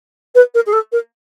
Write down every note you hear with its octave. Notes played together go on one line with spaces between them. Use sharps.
B4
A#4
G#4
A4
A#4